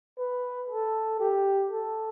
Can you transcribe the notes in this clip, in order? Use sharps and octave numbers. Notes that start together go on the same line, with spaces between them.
B4
A4
G4
A4